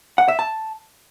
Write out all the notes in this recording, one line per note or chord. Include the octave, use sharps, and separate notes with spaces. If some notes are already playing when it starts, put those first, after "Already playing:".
F#5
E5
A5